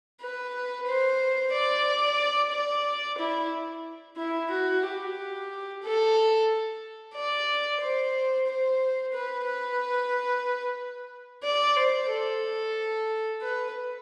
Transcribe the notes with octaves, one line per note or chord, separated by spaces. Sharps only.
B4
C5
D5
D5
E4
E4
F#4
G4
A4
D5
C5
C5
B4
B4
D5
C5
A4
B4